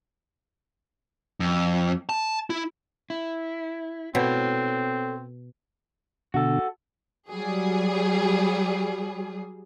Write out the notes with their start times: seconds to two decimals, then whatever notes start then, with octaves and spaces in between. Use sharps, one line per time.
1.40 F2
2.09 A5
2.50 E4
3.10 E4
4.15 B2 C4 A4 C#5
6.34 B2 D3 F#4 A4
7.30 F#3 G3 G#4